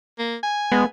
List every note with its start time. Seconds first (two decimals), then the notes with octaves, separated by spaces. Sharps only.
0.19 A#3
0.43 G#5
0.72 G#3 B3